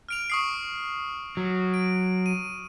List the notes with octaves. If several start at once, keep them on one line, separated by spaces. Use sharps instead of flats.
F6 D7 F7
C#6 D#6 C7
F#3
D7
D#7